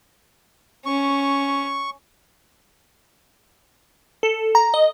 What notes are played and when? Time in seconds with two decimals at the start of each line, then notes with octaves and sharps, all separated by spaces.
0.86 C#4 C#6
4.23 A4
4.55 A#5
4.74 D#5